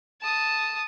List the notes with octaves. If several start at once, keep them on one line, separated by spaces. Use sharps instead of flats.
A5 D#6